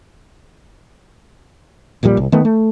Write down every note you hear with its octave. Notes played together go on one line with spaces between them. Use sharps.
D#1 A#1 A#2 G3
C2
D#3 A3 B3
A3